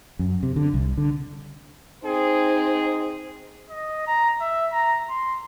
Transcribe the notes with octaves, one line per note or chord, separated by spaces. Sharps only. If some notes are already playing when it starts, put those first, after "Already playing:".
F#2
C3
D3
C2
D3
C4 D#4 G#4
D#5
A#5
E5
A#5
C6